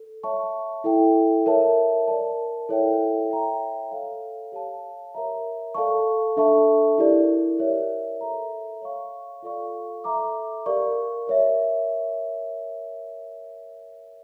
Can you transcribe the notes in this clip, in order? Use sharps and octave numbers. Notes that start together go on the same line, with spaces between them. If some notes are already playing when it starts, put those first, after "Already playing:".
Already playing: A4
C#5 E5 A5 C#6
E4 A4 E5 G5
A#4 C#5 E5 A5
A#4 D5 A5
E4 A4 C#5 E5 G5
C#5 E5 G5 A#5
A4 C#5 F5
G4 C#5 F5 A5
A#4 C#5 E5 A#5
A4 D5 F5 A5 C#6
D4 A4 E5 A5 C#6
E4 G4 A#4 D5
A#4 C#5 E5
A4 E5 A#5
C#5 F5 C#6
F4 A4 D5 F5 C#6
A4 E5 A#5 D6
G4 A#4 D5 F5 C#6
A#4 C#5 E5